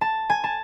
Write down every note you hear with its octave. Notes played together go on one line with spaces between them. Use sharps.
A5
G#5
A5